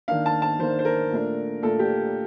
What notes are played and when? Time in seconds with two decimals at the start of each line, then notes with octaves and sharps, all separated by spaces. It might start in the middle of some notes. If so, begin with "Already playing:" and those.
0.08 D#3 A#3 D4 F5
0.26 A5
0.42 A5
0.59 D#3 A#3 D4 C5
0.79 C5
0.85 A#4
1.11 A#2 A3 D4
1.62 A#2 A3 D4 A4
1.79 G4